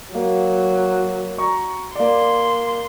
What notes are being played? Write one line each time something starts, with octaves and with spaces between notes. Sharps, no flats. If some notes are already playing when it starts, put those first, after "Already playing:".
F#3 A#3
A#5 C#6
A#3 D5 C6